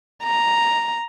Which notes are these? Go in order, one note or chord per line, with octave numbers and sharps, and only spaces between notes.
A#5